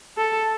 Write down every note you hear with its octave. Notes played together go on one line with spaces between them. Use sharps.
A4